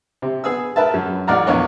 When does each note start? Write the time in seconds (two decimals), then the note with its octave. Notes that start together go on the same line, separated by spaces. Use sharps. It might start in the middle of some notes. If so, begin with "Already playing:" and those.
0.22 C3
0.44 B3 G#4 D#6 E6
0.76 A#4 B4 E5 A5
0.94 F#2
1.27 A1 D5 D#5 F#5 A#5 F6
1.47 A#1 E2 C#5 D#5